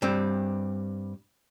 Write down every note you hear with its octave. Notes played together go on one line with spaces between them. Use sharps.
G2 G3 C4